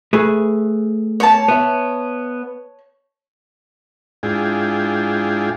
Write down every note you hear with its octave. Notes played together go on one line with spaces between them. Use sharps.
A3 G#4 B4
C#5 A5
B3 E5
G#2 D4 E4 F4 G#4 G5